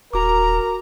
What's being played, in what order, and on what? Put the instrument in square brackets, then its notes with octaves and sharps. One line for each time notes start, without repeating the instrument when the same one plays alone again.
[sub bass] D#1 [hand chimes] F#4 D6 [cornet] A#4 [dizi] A#5